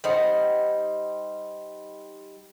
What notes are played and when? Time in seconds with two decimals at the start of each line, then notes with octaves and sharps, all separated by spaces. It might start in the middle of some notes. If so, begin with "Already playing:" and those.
0.04 G3 D#4 C5 F#5